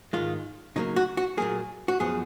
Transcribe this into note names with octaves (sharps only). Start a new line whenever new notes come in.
G#2 D#3 G#3 F4
C#3 F#3 A#3 D#4
F#4
F#4
A#2 F#3 A#3 G#4
F#4
F#2 F3 B3 G#4